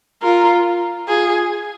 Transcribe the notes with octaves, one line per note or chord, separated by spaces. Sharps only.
F4 A#4
F4 G#4